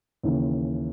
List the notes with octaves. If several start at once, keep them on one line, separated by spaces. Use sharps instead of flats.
D#2 C#3 E3